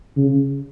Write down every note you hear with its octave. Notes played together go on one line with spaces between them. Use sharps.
C#3